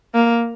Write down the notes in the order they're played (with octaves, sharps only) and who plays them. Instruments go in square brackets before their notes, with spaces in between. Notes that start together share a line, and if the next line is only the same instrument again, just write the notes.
[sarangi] A#3